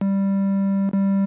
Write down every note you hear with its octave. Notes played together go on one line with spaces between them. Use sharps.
G3
G3